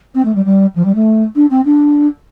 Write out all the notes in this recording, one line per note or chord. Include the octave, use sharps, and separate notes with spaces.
C4
A3
G3
G3
F3
G3
A3
D4
C4
D4